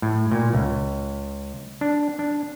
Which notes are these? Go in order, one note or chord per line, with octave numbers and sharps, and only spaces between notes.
A2
A#2
C#2
D4
D4